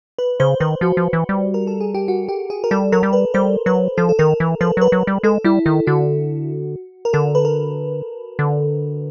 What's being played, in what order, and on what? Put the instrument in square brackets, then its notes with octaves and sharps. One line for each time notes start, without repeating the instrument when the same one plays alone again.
[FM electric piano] B4
[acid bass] C#3 [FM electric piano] C5
[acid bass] D#3 [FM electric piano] B4
[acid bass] F3 [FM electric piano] F#4
[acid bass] F3
E3
G3
[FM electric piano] A#4
A4
G#4
G4
F#4
G4
G#4
A#4
[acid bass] G3 [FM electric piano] A4
[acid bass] F#3 [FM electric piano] A#4
[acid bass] G3
[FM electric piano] B4
[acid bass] G3 [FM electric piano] C5
[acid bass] F#3 [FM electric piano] B4
[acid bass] F3 [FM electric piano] A4
[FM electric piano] A4
[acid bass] D#3 [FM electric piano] A#4
[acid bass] E3
[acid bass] F3 [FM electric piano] B4
[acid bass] F#3 [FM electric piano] B4
[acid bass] F#3
G3
[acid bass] G#3 [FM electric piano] A4
[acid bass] G3 [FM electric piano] E4
[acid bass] D#3 [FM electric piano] E4
[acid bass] D3 [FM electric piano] F#4
[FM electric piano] A#4
[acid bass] D3 [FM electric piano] A4
[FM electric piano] B4
A#4
[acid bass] D3